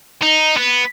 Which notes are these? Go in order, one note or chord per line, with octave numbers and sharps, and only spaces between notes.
D#4
B3